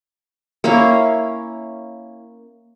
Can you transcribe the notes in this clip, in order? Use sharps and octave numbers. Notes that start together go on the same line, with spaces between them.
A#3 C#4 E4 F5